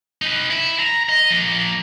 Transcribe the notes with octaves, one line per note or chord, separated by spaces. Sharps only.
D#4 B4
E4
A#5
D#5
F3 A#3